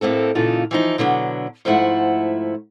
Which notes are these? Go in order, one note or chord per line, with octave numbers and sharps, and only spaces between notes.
A2 A#3 C4 A4
A#2 C#3 E3 D#4 F4 A4
E3 F3 D#4
B2 D3 F#3 D4
G#2 F3 A3 E4 F#5